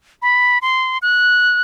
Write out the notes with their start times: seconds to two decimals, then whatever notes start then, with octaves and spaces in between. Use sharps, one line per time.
0.22 B5
0.62 C6
1.02 F#6